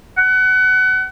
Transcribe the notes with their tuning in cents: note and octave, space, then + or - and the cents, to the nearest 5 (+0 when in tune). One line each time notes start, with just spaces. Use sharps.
F#5 +30